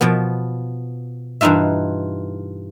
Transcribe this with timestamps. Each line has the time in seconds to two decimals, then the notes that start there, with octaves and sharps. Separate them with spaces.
0.01 B2 F3 B3
1.41 G2 E3 D#4 F4 E5